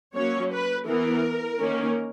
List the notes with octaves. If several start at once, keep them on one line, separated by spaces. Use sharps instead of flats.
F#3 A#3 C#4 C#5
B4
E3 B3 A#4
D#3 A#3 C#4